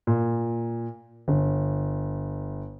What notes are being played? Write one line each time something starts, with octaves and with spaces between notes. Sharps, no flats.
A#2
G1